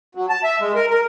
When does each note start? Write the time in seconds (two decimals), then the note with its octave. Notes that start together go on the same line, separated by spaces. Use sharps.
0.15 F#3
0.29 A5
0.44 E5
0.60 G#3
0.75 A#4
0.90 A#4